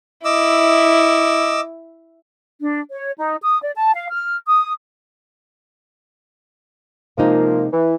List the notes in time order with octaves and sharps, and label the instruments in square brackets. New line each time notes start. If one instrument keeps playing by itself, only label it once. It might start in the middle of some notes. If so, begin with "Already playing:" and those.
[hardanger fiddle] E4 [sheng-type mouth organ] D#5 D6 E6
[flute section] D4
C#5
D#4
D#6
D5
A5
F5
F6
D#6
[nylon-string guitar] C3 G#3 D#4 [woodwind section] F3 A#3
[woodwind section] E3